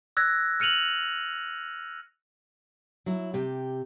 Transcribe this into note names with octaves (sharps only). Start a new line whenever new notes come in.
E6 F#6 G#6 A#6
F6 C#7 D#7 F7 F#7
F#3 E4
C3 G4